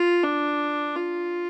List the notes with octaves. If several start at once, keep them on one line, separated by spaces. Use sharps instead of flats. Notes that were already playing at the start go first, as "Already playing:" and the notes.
Already playing: F4
D4
F4